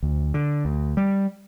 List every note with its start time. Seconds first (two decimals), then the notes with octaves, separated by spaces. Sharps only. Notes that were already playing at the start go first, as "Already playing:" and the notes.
0.03 D2
0.34 D3
0.65 D2
0.97 G3